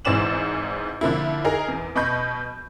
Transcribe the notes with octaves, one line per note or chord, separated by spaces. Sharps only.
G#1 G#2 E3 D5 E7 F#7
D3 F3 A#3 E4
D#4 G#4 A#4 A#5
E2
B2 D#5 B5 C#6 G6